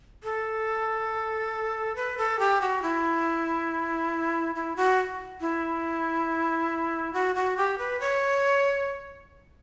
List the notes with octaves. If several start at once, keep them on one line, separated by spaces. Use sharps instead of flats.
A4
B4
A4
G4
F#4
E4
E4
F#4
E4
F#4
F#4
G4
B4
C#5